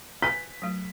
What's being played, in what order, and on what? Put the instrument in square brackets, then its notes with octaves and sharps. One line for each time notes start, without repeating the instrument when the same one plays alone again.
[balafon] B4 G#5 B5 [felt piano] B6
[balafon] F#3 A3